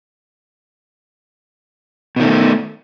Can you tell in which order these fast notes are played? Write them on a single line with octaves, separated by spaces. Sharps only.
B2 D#3 A3